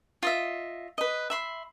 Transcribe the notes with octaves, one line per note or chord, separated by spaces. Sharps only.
F4 D#5 E5
B4 D#5
E5 B5 C6